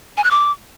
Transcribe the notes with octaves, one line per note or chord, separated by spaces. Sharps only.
G#5
F#6
D6